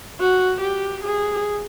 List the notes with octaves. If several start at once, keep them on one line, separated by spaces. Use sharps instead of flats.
F#4
G4
G#4